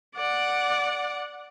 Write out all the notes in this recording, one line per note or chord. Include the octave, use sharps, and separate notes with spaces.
D5 F#5